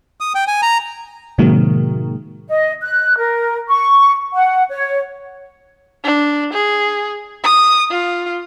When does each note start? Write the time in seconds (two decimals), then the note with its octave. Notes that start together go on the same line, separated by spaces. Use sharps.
0.20 D#6
0.35 G5
0.47 G#5
0.62 A#5
1.38 A2 C3 D#3 F#3 G#3 A#3
2.48 D#5
2.82 F#6
3.17 A#4
3.69 C#6
4.34 F#5
4.69 C#5
6.04 D4
6.53 G#4
7.43 D#6
7.91 F4